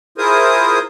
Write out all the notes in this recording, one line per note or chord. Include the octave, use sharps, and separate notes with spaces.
E4 F4 G#4 A#4 C5 D#6